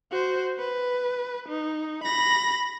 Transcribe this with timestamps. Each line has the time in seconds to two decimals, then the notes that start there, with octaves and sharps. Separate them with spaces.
0.11 F#4 C5
0.59 B4
1.49 D#4
2.04 B5 A#6